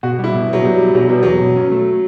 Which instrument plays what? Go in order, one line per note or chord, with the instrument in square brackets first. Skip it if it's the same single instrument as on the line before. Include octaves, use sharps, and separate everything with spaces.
[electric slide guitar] B2 [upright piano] F#4
[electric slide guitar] G3 [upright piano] E4
[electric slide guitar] B2
[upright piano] F#3 [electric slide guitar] B3
[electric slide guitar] B2 [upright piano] G3
[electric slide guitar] G3
[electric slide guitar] B2 [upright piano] F#3
[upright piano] G3 [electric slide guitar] B3
[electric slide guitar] E2 [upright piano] F#3
[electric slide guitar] B2
C#4
A3